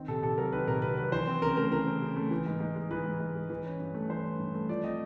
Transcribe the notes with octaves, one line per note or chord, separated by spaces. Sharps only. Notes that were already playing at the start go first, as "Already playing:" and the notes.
Already playing: D#3 C4
C3 A4
C3 A4
F#3 A#4
D#3 B4
C3 A#4
C3 B4
F#3 B4
E3 C5
C4
C#3 A#4
A3 A#4
E3 A#4
C4
C#3
A3
E3
G#2
G#2
G#3
E3 B4
G#2
G#2
G#3
E3
C#4
G2
A3
E3 C5
C#4
G2
A3
F3 D5
C4 D#5